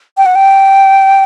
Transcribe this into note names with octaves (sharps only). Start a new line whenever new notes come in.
G5
F#5
G5